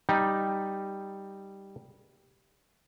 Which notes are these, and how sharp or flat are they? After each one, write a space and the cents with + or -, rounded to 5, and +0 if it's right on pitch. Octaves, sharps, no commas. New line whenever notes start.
G3 +0 D#4 +0